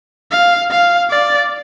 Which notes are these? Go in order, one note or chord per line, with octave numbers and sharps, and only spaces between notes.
F5
F5
D5